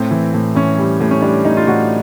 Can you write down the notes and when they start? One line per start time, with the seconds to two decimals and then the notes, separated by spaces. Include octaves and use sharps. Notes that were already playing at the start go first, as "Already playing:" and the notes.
Already playing: A2 C4
0.11 E3
0.34 A2
0.55 E3 C#4
0.79 G3
1.01 A2
1.11 C#4
1.22 G3 D4
1.45 A2 D#4
1.57 F4
1.67 A2 F#4